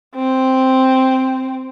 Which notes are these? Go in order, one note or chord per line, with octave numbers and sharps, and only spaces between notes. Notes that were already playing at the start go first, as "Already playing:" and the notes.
C4